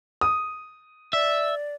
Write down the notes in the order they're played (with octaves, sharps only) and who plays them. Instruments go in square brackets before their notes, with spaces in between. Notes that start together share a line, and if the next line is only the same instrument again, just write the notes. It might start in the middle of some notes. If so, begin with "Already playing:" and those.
[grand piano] D#6
[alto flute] D5 [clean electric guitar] E5